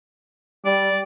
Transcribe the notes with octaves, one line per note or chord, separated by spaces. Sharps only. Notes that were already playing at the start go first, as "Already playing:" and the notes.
G3 D5